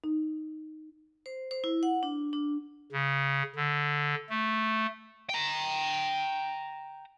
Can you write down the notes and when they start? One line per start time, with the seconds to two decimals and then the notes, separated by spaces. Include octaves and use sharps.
0.04 D#4
1.26 C5
1.51 C5
1.64 E4
1.83 F#5
2.03 D4
2.33 D4
2.92 C#3
3.56 D3
4.29 A3
5.29 G5 A#5